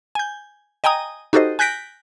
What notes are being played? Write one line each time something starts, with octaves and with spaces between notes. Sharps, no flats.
G#5 G6
D#5 G5 G#5 A#5 D#6
D#4 F#4 G4 A4 C5 D#5
G#5 F#6 G6 A#6 B6 D7